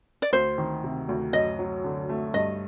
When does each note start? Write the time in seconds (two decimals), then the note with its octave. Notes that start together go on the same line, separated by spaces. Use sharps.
0.22 D5
0.33 D2 C5
0.58 D#3
0.84 C3
1.09 D2
1.33 F#2 D#5
1.59 F#3
1.84 D3
2.09 A3
2.34 G2 D#5